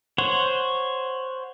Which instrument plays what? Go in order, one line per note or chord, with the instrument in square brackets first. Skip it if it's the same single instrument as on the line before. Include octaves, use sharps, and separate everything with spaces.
[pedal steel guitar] C5 C#5 F#5